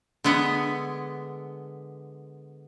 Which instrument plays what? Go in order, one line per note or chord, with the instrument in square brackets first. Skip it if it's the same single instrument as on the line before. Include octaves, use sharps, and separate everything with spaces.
[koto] D3 G#3 B3